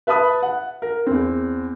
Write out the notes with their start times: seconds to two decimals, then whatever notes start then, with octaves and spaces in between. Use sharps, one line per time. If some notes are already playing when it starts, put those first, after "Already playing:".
0.07 B4 E5 A5 B5 D#6
0.43 F#5
0.82 A#4
1.07 E2 C4